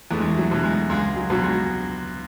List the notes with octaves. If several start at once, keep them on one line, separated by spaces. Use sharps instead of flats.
E2 A3
G#3
A3
F#3
B2 F#3
G#3
C#2 G#3
F#3
B2 F#3
G#3